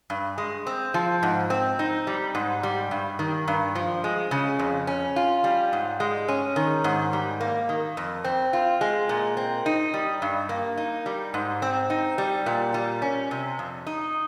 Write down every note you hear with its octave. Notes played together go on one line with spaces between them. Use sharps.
G2
G#3
C4
F3
G#2
C4
D#4
G3
G#2
G3
G2
D#3
G2
F3
G#3
C#3
F2
C#4
F4
G3
G#2
G#3
C#4
D#3
G#2
G3
A#3
D#3
F2
C4
F4
G#3
A#2
C4
D#4
G3
G2
A#3
D#4
G3
G#2
C4
D#4
G3
A#2
G3
C#4
C3
F2
D#4